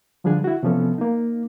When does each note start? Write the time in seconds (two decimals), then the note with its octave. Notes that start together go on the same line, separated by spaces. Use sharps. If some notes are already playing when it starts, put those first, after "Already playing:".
0.24 D3 F3 G3 D4 G#4
0.44 E4 F#4
0.63 C3 E3 F3 B3 C#4 A4
0.98 A#3 D#4